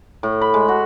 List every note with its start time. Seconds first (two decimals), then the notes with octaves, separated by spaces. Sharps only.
0.23 A2
0.41 B5
0.54 G#3
0.68 F#4